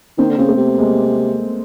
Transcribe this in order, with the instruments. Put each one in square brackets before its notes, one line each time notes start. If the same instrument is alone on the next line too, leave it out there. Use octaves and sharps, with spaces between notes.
[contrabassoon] D#3 [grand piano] A#3 C4
[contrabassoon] D3
[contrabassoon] C#3 [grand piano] C4
[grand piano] A3 B3
[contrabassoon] C3
[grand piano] G#3 A#3